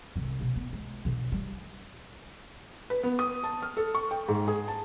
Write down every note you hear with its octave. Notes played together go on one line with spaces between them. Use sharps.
C2 C4
B2
B3
G#3
B2 D3
G3
B4
B3
D#6
A5
F6
A4
C#6
G5
G#2
G#4
A5